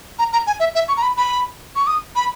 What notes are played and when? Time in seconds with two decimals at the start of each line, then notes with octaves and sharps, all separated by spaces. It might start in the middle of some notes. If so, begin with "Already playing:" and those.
0.19 A#5
0.33 A#5
0.47 G#5
0.60 E5
0.75 E5
0.88 C#6
0.97 A#5
1.02 B5
1.17 B5
1.76 C#6
1.87 D#6
2.16 B5